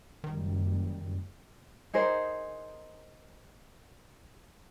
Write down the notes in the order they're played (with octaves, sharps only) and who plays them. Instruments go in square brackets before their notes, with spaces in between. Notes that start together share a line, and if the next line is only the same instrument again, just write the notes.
[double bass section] F#1 F#2 G3 [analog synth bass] D#3
[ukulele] D#4 G#4 A#4 C5